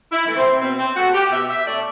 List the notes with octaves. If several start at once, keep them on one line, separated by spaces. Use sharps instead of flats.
E4
E3 A3
C4
B2 C4
C4
A3 F#4
G4
B2 E5
E5
A3 D5